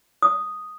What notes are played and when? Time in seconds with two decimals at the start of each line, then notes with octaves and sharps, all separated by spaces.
0.22 D#6